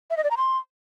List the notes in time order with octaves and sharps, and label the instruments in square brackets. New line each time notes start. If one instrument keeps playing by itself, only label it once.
[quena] E5
D#5
D5
A#5
C6